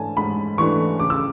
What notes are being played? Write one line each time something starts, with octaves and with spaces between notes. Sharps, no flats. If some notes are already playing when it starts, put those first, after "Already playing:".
Already playing: G#2 E3 A3 D4 G#5 A5
G#2 B5
E3 A3 D4 C#6
C#3 D6
E6